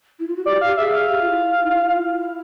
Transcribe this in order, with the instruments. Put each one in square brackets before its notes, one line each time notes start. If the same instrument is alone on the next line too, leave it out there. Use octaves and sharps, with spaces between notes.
[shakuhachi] E4
F4
F#4
[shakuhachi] G4 [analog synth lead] D5
[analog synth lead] F5
[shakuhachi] G4
[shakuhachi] G#4 [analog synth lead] E5
[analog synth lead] F5
[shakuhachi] G4
F4
E4
D#4
E4
F4
E4